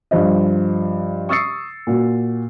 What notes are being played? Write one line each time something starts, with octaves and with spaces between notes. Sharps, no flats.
G2 F3 C5 D#5
C#6 D#6 E6 A6 C7 C#7
A#2 F#4